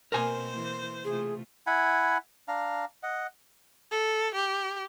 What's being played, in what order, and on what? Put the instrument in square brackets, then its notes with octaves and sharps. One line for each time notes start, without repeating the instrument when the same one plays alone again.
[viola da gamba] B2 A#3 C4 [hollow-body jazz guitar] A#4 G#5 [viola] C5
[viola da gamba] E3 A#3
[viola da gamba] C3 A3 F4 [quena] G#4
[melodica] E4 F#5 G#5 B5
D4 F5 A#5
D#5 F#5
[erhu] A4
G4